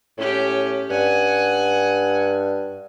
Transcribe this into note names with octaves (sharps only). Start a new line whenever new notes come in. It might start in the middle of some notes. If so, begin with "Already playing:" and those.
A2 C#4 G4
G2 F#5 G#5